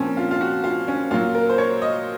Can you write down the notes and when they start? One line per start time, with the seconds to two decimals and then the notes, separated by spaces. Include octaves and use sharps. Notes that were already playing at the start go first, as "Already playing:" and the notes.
Already playing: A#2 F3 C4 C#4
0.17 F4
0.31 F4
0.41 F#4
0.64 F4
0.88 C#4
1.11 A#2 F#3 F4
1.35 A#4
1.49 C5
1.58 C#5
1.82 D#5